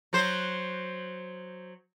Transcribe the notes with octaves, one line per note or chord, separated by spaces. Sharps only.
F#3 C5